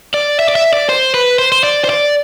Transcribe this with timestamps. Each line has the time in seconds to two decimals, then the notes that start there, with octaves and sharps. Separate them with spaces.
0.14 D5
0.39 E5
0.49 D5
0.55 E5
0.73 D5
0.89 C5
1.14 B4
1.39 C5
1.52 C5
1.64 D5
1.84 C5
1.89 D5